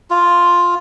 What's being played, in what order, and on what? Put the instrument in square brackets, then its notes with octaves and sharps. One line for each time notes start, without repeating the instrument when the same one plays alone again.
[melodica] F4